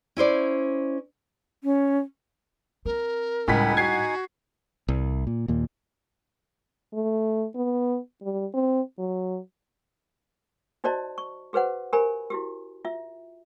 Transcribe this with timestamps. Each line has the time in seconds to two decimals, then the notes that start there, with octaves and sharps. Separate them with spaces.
0.17 C#4 E4 C5 D5
1.64 C#4
2.86 C4 A#4
3.48 C#2 A2 G3 D#4 F#5 G#5 B5 B6
3.77 F#4 G#6 C7
4.88 C2
5.27 A#2
5.48 D#2 A#2
6.94 A3
7.55 B3
8.22 G3
8.54 C4
8.98 F#3
10.84 D#4 F#4 C5 D5 D#5 A5
11.18 C#6
11.53 F#4 G#4 B4 C5 F#5
11.93 G4 A#4 C5 G#5 B5
12.30 E4 F#4 G4
12.85 F4 E5